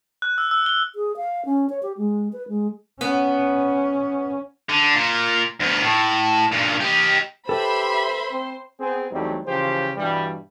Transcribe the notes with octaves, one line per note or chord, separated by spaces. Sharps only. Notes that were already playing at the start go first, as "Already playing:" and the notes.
F#6
E6
E6
G7
G#4
F5
C#4
C#5
G4
G#3
B4
G#3
B3 C#4
D3
A#2
D2 B3
A2
G2 A#2
G4 D#5
G4 A4 B4 C5 E5 B5 C6
C4
B3 C4 G#4
E2 F#3 G3 A3 C4 D#4
C#3 E3 F3 G4 C5
G2 B2 E3 G3